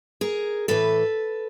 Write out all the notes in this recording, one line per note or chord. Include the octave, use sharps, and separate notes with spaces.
G#4 A#4
A2 E3 A4 B4